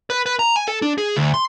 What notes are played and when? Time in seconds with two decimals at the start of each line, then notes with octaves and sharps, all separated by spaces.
0.10 B4
0.26 B4
0.39 A#5
0.56 G#5
0.68 A4
0.82 D4
0.98 G#4
1.17 D2
1.34 C6